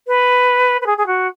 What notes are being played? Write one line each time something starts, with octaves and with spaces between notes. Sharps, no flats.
B4
B4
G#4
G#4
F#4